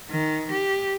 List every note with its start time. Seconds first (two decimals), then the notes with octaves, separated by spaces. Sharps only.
0.10 D#3
0.51 G4